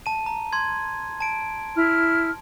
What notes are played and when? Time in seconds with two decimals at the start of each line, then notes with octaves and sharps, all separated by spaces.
0.06 A5 D#7
0.26 A#5
0.53 C6 G#6
1.20 A5 D7
1.76 E4 F6